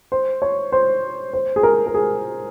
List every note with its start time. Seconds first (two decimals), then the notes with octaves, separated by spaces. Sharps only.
0.12 C5
0.42 C#5
0.72 C5
1.33 C5
1.56 G#4
1.63 A#4
1.87 A#4
1.94 G#4